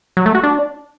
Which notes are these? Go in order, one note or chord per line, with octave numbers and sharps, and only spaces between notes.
F#3
A3
F#4
D4